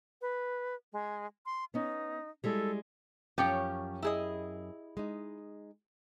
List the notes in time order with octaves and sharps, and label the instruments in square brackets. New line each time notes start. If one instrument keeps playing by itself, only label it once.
[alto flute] B4
G#3
C6
[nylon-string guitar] B3 C#4 [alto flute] D#4
[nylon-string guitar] G3 G#3 E4 [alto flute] A4
[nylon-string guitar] F#2 [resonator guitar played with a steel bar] F3 C#4 C#5 [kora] G4 G5
[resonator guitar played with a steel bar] E4 G#4 D#5
[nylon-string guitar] G#3 D#4